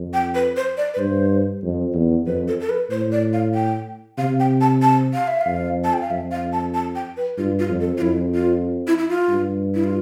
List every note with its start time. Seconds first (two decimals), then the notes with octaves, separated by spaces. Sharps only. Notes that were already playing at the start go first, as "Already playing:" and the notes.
Already playing: F2
0.14 G5
0.35 B4
0.56 C5
0.77 D5
0.94 B4
0.99 G2 C5
1.63 F2
1.95 E2
2.27 F2 B4
2.48 A4
2.60 A4
2.70 B4
2.90 A2 C5
3.12 D5
3.33 F5
3.55 G5
4.18 C3 F5
4.40 G5
4.61 A5
4.82 A5
5.14 F5
5.28 E5
5.41 F5
5.47 F2
5.84 A5
5.93 G5
6.01 F5
6.10 F2 E5
6.31 F5
6.53 A5
6.74 A5
6.95 G5
7.17 B4
7.38 G2 F4
7.59 F4
7.69 F2
7.81 A4
7.97 F4
8.02 F2 E4
8.34 F4
8.87 E4
8.98 E4
9.09 F4
9.29 G2
9.75 E4
9.84 F4